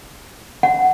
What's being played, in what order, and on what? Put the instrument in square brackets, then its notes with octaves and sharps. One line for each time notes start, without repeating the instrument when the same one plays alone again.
[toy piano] F#5